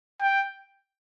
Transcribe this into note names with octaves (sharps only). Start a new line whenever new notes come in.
G5